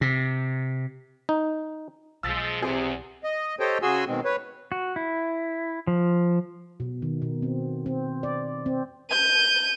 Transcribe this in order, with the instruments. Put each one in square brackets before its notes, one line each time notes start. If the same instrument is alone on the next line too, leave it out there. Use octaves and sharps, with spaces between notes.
[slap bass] C3
[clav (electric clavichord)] D#4
[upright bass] B1 [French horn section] F3 G#3 [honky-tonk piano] E6 A6 B6
[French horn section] E2 [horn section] C3 [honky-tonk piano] G#4
[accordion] D#5
G4 A4 C5 C#5 D#5 G5
C#3 F#4 G#4 G#5 C6 E6
B2 D#3 G#3 C4
B4 C#5
[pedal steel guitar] F#4
E4
F3
[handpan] B2
D#3
B2
C4
C4
D5
C4
[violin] G6 D#7